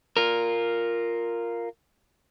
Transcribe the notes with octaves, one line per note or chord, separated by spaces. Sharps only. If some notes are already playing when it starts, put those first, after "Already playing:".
F4 A#4